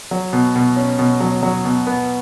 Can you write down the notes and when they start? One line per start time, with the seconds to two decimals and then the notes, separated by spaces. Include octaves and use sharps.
0.11 F#3
0.33 B2
0.56 B2
0.76 C#4
0.99 B2
1.21 F#3
1.43 F#3
1.65 B2
1.87 B3